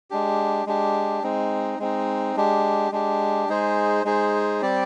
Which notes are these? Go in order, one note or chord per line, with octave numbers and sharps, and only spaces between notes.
G#3 D4 G4
G#3 D4 G4
G#3 C4 D#4
G#3 C4 D#4
G#3 D4 G4
G#3 D4 G4
G#3 D#4 G#4 C5
G#3 D#4 G#4 C5
G3 C4 G4 D5